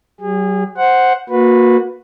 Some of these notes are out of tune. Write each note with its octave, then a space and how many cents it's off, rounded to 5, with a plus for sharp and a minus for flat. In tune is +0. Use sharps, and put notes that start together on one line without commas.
F#3 +40 G#4 -30
C5 +0 F#5 +0
A#3 +0 F#4 -30 B4 +0